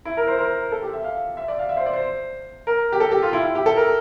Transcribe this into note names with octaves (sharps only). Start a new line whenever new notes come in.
E4
A#4
C5
A#4
A4
G4
E5
F5
E5
D5
F5
E5
C5
D5
C5
A#4
G4
A4
G4
F4
E4
E4
G4
A4
A#4